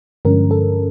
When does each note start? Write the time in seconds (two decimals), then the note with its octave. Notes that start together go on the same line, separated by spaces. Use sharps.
0.25 G2 D3 F3 G#3 C#4 A#4
0.51 A4